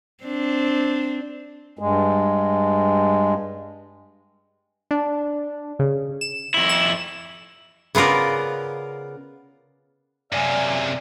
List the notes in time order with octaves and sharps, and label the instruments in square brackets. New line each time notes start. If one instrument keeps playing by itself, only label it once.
[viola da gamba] C4 D4
[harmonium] G2 G#3
[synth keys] D4
C#3
E7
[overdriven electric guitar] F2 E4
[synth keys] E7
[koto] C#3 B3 F4 A#4 D5
[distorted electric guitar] F#2 C3 [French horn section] D5 [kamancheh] F5 G#5